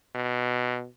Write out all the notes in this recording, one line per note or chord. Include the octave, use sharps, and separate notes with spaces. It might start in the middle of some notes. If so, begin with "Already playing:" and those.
B2